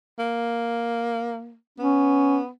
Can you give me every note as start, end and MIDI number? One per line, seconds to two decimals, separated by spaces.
0.18 1.55 58
1.78 2.49 59
1.78 2.39 61